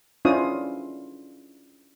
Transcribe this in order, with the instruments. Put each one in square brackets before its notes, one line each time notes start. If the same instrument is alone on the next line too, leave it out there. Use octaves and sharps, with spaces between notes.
[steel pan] C#4 D4 E4 F4 C5 D#6